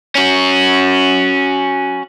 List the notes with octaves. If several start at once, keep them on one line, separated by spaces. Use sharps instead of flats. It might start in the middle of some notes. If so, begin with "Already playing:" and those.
C#4 F#4